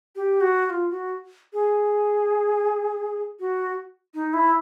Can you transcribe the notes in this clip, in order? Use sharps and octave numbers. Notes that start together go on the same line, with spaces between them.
G4
F#4
F#4
F4
F#4
G#4
F#4
D#4
E4